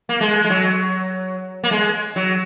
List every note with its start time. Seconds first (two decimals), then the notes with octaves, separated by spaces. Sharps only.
0.09 A#3
0.21 G#3
0.44 G#3
0.50 F#3
1.63 A#3
1.71 G#3
2.16 F#3